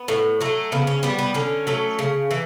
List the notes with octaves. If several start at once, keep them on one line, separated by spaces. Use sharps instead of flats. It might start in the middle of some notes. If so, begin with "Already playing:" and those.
Already playing: B3
A2
F#3 A3
C#3 B3
C#4
G3 B3
B3
D3 C#4
F#3 A3
C#3
E3